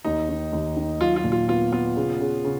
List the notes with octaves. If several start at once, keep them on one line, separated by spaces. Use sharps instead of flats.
D#2 D#4
D#3
D#2
D#3
F#3 F4
F4
A#2
F4
B3 F4
B3 F4
C#3
C#3
C#3